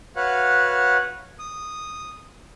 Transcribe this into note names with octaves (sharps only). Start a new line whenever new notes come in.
F#4 B4 C#5 F5 F#5
D#6